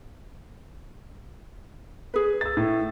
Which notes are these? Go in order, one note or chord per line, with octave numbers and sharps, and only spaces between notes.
G#4 B4
E6 A6
A2